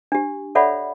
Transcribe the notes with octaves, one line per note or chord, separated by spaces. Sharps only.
D4 G4
A4 C#5 D5 E5 F#5 B5